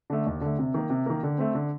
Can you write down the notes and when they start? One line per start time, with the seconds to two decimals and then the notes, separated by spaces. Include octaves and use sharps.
0.10 D3 A3
0.26 D#2
0.41 D3 A3
0.59 C3
0.74 D#3 A#3
0.90 C3
1.06 D#3 A#3
1.23 D3
1.38 A3 C4
1.55 D3